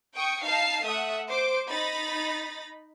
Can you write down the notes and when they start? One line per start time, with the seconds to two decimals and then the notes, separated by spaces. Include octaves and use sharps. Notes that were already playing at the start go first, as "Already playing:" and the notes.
0.14 G5 C#6 D#6
0.44 D#4 F5 A5 C7
0.83 A3 E5 F#5 D#6
1.28 C5 D6
1.69 D#4 B5 A6 A#6